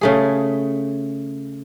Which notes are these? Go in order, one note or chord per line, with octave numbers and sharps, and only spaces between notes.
C#3 A3 G#4